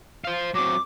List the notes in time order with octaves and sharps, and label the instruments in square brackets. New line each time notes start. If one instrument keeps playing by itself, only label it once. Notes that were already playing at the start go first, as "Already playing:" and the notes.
[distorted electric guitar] C5 F5
[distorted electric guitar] F#3 C4 [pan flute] D6